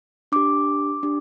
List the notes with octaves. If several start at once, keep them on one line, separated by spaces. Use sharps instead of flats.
D4 G4 D6
D4 G4